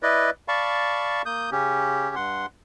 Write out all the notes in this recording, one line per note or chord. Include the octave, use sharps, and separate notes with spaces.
E4 B4 D5 D#5
D5 F5 A5 B5 C#6
A#3 D#6 G6
C#3 C#4 G4
G2 F#5 C6